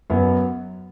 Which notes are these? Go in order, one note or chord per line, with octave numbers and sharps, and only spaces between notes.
F#2 F#3 B3